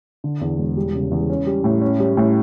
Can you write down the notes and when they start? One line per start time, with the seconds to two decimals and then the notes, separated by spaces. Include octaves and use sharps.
0.24 D3
0.41 E2
0.58 E1
0.77 G3
0.94 C#3
1.11 E2
1.30 C#4
1.47 G3
1.64 A2
1.82 C#4
2.00 G3
2.17 A2